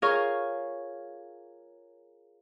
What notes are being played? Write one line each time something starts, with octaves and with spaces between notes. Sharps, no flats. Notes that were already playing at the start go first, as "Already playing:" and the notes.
F4 G#4 A#4 C#5 F5 C#6